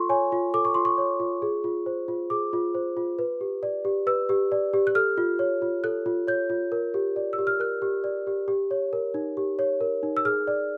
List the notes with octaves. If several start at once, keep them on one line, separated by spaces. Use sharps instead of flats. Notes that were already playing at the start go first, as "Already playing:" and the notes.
Already playing: F4 A4 C6 C#6
C#5 G#5
F4
A4 D6
C#6
F4 C6
C#6
C#5
F4
G#4
F4
C5
F4
G#4 D6
F4
C5
F4
B4
G4
D5
G4
B4 E6
G4
D5
G4
F#6
A4 F6
F4
C#5
F4
A4 F#6
F4
C#5 G6
F4
A#4
G4
D5
E6
G4
F6
A#4 F#6
G4
D5
G4
G4
C#5
A#4
D#4
G4
C#5
A#4
D#4
E6
G#4 F6
D5